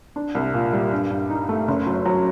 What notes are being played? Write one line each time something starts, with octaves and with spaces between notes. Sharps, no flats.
D4
C2
A#2
G3
G2
G2
D#4
A3
F#1
F#3
F#3